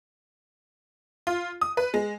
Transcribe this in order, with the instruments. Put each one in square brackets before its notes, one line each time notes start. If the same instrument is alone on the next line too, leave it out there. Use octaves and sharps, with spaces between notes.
[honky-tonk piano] F4
D#6
B4
G#3